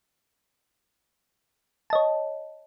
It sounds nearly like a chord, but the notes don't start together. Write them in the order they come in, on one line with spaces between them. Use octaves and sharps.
A5 D#5 C#5